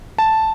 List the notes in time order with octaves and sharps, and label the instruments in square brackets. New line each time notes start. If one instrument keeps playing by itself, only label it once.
[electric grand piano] A5